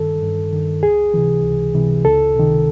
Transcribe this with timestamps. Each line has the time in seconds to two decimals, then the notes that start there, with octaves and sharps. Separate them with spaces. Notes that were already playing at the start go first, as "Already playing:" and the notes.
Already playing: G2 D#3 A4
0.22 G2
0.53 D#3
0.83 C#2 G#4
1.14 C3 E3
1.44 C#2
1.74 C3 E3
2.05 C#2 A4
2.35 C3 D#3